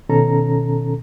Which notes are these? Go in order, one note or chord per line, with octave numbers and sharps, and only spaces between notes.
B2 D#3 C#4 A4 A#5